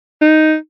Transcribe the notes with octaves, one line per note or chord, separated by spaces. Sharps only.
D#4